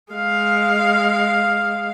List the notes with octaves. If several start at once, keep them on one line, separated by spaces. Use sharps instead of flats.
G#3 F5